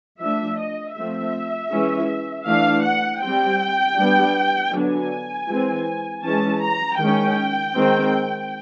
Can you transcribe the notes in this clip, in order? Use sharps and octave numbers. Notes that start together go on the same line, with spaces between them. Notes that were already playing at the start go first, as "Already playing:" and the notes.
F3 A3 D4 E5
D#5
F3 A3 C4 E5
E3 G#3 C#4
E3 A3 D4 F5
F#5
G3 C4 G5
G3 B3 D4
D3 F#3 B3 D4 G#5
E3 G#3 C4
E3 G#3 C#4 A5
A#5
D#3 G#3 C#4 G5
D#3 G#3 C4